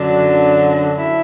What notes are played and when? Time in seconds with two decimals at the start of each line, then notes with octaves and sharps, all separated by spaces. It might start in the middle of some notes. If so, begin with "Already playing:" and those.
Already playing: F#2 D3 F#3 D4
0.95 E4